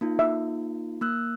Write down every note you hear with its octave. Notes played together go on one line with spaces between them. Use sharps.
A#3 D#4 F4
E5
A#3 E6 F#6